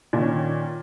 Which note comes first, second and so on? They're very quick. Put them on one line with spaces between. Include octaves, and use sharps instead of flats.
A#2 D#3 C#4